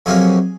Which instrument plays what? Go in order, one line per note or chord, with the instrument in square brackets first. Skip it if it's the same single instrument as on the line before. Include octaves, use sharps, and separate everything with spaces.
[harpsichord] F2 C3 F#3 A#3 C#4 G#4